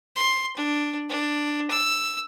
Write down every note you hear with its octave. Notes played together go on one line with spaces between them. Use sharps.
C6
D4
D4
E6